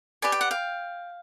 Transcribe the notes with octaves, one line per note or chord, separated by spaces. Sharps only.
G4 B4 D5 G#5
G5
F#5
F5 G5